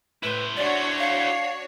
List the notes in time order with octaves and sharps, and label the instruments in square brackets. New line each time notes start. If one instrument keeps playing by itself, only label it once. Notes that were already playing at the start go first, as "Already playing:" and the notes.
[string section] A2 [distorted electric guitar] E4 C5 [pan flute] B4
[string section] D4 F#4 C#5 [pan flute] D5
[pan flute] F5